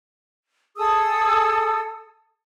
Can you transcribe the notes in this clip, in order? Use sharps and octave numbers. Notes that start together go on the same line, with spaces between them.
G#4 A4 D#6 E6